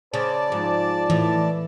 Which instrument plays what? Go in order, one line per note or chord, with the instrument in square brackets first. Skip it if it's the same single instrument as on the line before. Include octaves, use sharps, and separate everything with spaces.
[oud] C#3 [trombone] C5 [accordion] D5 A5
[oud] G#2 [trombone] F3
[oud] A2 [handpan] E3